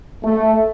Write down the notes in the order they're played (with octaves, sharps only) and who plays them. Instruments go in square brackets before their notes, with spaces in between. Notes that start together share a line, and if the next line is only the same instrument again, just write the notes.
[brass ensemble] A3